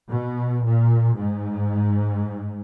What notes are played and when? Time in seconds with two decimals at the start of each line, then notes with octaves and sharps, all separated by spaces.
0.09 B2
0.64 A#2
1.16 G#2